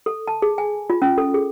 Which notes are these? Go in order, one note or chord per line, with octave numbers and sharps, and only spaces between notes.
A4
A5
G#4
G#5
F4
C#4
A4
G#4